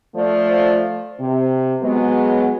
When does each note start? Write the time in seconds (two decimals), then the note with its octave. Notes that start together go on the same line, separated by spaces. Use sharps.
0.16 F3 A3 D5
1.20 C3
1.82 F#3 G#3 B3